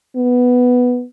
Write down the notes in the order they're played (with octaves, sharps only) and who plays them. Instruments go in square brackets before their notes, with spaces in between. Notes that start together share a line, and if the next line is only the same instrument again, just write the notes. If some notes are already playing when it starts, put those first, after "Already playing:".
[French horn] B3